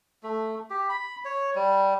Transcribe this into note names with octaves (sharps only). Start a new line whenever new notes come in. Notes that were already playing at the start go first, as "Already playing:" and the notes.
A3
G4
B5
C#5
G3